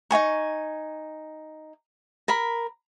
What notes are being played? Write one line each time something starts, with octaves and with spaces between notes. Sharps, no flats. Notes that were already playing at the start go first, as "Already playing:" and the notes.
D#4 E4 G#5 C#6
A#4 B5